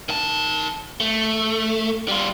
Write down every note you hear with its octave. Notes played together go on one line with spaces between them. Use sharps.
D#3 A5
A3
G3 F4